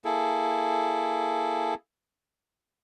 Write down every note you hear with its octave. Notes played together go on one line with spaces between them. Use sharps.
A#3 E4 G#4 A4